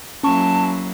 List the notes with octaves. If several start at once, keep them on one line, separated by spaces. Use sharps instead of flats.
F#3 A#3 C#4 E4 A5 C#6